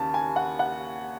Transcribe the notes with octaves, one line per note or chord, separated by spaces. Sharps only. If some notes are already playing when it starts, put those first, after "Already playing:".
Already playing: D#2 C#3 A5
G#5
F#5
F#5